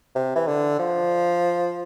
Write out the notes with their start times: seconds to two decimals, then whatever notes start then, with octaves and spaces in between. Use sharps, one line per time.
0.15 C3
0.36 E3
0.47 D3
0.79 F3